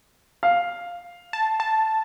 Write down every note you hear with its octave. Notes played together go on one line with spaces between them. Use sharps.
F5
A5
A5